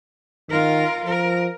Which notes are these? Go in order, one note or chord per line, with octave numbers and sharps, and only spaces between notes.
D#3 F4 A#4
F3 A#4